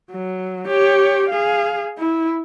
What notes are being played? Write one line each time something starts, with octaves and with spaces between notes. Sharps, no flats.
F#3
G4 C#5
G#4 F5
E4